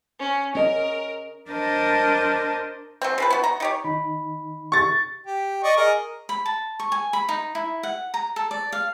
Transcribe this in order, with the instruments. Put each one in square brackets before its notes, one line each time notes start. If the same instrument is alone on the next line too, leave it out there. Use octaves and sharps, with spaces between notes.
[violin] C#4
[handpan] C#4 D#5 [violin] A#4
[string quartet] D4 A#4 C5 D#5 A5
[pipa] F#3 G#3 C4
C#3 F3 B4
B3 F#4
A#5
D#4 G4 C#5
[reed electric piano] D#3 D#4 B5
[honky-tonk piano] C#6 A6
[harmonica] G4
D5 D#5 C#6
G#4 A#4 D#5
[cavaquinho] B5
A5
C#6
G#5
B5
D#4
E4
F#5
A#5
A4
D5
F5